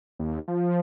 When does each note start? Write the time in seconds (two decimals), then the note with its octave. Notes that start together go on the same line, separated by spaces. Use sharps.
0.19 D#2
0.48 F3